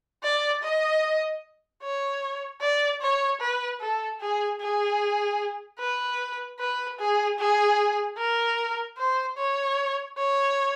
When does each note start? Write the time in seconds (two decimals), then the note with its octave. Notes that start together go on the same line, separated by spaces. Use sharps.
0.23 D5
0.63 D#5
1.82 C#5
2.61 D5
3.02 C#5
3.41 B4
3.81 A4
4.21 G#4
4.61 G#4
5.80 B4
6.60 B4
6.99 G#4
7.39 G#4
8.18 A#4
8.98 C5
9.38 C#5
10.18 C#5